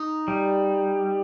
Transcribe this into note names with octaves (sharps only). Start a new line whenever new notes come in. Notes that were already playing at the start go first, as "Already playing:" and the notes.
Already playing: D#4
G3